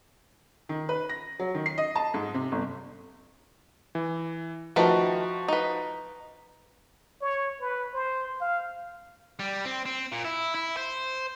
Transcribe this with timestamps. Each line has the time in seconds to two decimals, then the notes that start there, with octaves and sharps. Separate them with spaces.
0.69 D#3
0.89 B4
1.09 A#6
1.39 F#3
1.55 D#3
1.66 C7
1.78 D#5
1.96 A5
2.14 G#2
2.34 C3
2.52 G1
3.95 E3
4.76 D#3 F3 A3 F#4 B4
5.48 D#4 B4
7.21 C#5
7.61 B4
7.93 C5
8.41 F5
9.39 G3
9.65 C4
9.86 C4
10.12 A#2
10.25 E4
10.55 E4
10.77 C5